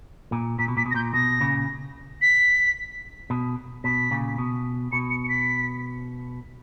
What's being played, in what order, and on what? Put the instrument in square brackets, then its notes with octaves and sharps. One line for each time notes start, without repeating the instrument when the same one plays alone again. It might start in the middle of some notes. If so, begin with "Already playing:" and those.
[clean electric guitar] A#2
[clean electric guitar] A#2 [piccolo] B6
[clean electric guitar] B2
[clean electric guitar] A#2 [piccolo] B6
[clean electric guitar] B2
[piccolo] A#6
[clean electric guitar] A#2 [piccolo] G6
[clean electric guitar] B2 [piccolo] A#6
[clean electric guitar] A#2 C#3
[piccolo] B6
[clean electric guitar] B2
[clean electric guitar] B2 [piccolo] B6
[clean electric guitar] A#2 C#3
B2
[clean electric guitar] B2 [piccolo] C#7
[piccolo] C#7
C#7
B6